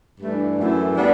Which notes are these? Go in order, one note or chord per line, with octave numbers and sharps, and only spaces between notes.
G2 E3 A3 D4
F#2 E3 A3 E4
G3 B3 D4